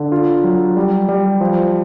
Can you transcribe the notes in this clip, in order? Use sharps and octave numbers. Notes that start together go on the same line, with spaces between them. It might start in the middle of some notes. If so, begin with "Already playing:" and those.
Already playing: D3
F4
F#3
G3
G3
F3